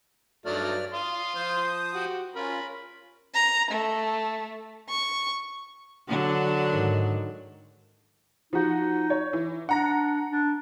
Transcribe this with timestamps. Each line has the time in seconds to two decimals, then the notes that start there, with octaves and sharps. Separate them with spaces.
0.46 G2 F#3 A3 D#4 D5 F6
0.94 F5 C6 D#6
1.35 F3 C5 D#6
1.94 F#4 G4
2.36 C#4 F4 A#4 B5
3.34 A#5
3.71 A3
4.89 C#6
6.08 D3 F#3 D4
6.68 G#2 D#3
8.53 F3 D#4 F#4
9.10 C#5
9.33 E3
9.69 D4 F#5 A#5 A#6
10.31 D4